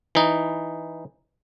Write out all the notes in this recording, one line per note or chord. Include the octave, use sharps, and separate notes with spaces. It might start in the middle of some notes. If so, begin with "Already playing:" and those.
E3 D#4